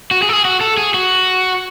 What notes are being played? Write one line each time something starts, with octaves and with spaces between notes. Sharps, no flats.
F#4
G#4
A4
G#4
F#4
A4
G#4
F#4